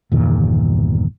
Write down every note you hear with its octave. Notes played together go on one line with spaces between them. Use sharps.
G1 E2 A#2 D#3